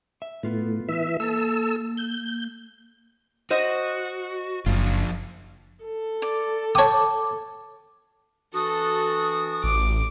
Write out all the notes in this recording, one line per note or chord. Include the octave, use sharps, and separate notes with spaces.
E5
A2 B3 F4 B4
E3 E5
A#3 A4 E6
G6
F#4 C5 D#5
F#1 F3 D4 F4
A4
D5
C#5 G5 A5 D6 D#6
E3 D4 F#4 A4 D#6
A1 D6